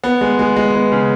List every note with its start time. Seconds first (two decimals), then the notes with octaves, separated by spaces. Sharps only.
0.04 B3
0.21 G#3
0.39 G#3
0.56 G#3
0.74 B3
0.92 C#3